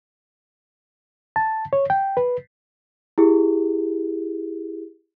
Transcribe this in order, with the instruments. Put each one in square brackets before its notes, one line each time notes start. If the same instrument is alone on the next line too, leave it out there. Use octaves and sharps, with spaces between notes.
[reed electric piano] A5
C#5
G5
B4
[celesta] E4 G4 G#4